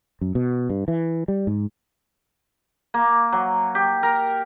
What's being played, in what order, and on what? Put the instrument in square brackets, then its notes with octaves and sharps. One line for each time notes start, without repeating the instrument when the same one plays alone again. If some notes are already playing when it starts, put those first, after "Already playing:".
[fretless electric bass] F#2
B2
G2
E3
G3
G#2
[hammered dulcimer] A#3
F#3
G4
A#4